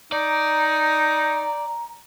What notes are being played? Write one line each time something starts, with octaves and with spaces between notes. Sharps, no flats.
D#4 D5 A#5